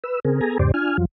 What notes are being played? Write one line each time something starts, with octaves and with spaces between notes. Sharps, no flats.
B4 E6
C#3 C4 G#4 A#4
B3 G#4 A4 G#5 A#5
E2 G#2 C#3 G4 C5 D5
D4 F4 G#5 F6
F2 F3 F#3 F4